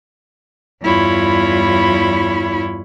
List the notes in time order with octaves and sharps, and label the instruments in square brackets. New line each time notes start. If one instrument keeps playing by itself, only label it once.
[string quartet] E2 G2 E4 F4 C#5 B5